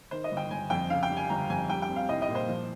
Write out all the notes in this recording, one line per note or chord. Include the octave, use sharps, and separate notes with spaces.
D#3 C5
D#5
G1
G5
G1 G#5
F2 G5
C#3 F5
G5
G3
G#5
G1 A#5
F2 G#5
G3 G5
G5
C4
F5
C2 D#5
D#5
A#2
C5
F3